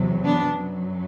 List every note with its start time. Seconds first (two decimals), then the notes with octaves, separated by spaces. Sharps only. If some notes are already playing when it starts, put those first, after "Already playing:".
Already playing: E2 C3 F#3
0.24 B3 D4
0.55 F#2 F#3